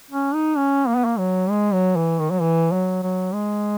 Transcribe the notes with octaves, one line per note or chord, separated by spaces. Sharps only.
C#4
D#4
C#4
A#3
B3
A#3
F#3
G#3
F#3
E3
D#3
F#3
E3
F#3
F#3
G#3